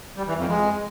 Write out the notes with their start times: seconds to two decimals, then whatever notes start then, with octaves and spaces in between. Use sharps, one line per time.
0.16 G3
0.27 E3
0.37 F2
0.48 G#3